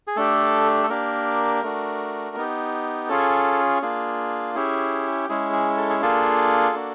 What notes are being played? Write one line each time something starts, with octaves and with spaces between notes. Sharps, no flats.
G#4
A3 D4 G4 A4
A4
A#3 D4 G4 A#4
A3 D4 F#4
B3 D#4 G4
C#4 F4 G#4 A4
A#3 D4 F4 G#4
C#4 E4 G4 G#4
G#3 C#4 E4 G#4
G#4
A4
G#4
A#3 D4 F4 G#4 A4
A#3 D4 F#4